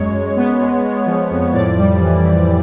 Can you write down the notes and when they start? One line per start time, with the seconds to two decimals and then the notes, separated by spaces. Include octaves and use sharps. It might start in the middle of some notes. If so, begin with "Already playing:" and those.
Already playing: F#2 G#3 C#5
0.13 F#2
0.36 B3
0.60 G#3
0.84 G#3
1.06 F3
1.30 F2
1.53 A2 D5
1.77 G3
2.00 E3
2.24 E3